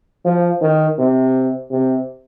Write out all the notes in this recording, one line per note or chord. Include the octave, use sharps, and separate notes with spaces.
F3
D#3
C3
C3